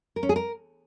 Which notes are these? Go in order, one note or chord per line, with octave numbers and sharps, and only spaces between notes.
A#4
C#4
G#4
A#4